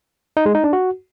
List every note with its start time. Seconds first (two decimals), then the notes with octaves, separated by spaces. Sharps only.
0.37 D#4
0.46 G#3
0.55 D#4
0.64 D4
0.73 F#4